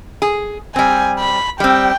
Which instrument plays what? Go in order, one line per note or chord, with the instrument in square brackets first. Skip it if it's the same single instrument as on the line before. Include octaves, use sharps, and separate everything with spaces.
[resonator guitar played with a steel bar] G#4
[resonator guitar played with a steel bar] G3 C4 [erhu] G#5
[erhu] B5
[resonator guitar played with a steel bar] G3 C4 [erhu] G5